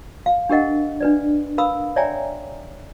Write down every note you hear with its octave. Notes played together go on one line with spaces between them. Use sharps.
F5
D4 G4 A#4 D#5 F#5
D4 B4 D5
A#4 B4 F5 B5 D#6 E6
C#5 D5 E5 G5 G#5 A#5